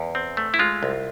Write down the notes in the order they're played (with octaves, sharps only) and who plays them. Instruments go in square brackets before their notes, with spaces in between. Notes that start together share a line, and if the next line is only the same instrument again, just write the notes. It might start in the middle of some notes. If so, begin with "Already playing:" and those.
Already playing: [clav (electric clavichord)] E2
C4
A3
E4
G#3 F4
C2